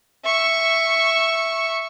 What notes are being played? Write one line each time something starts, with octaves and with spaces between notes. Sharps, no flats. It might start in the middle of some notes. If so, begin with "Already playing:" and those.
E5 C#6